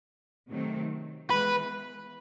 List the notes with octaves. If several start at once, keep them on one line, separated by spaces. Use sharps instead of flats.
C3 D#3 F#3 A3 C4
E3 G#3 B3 B4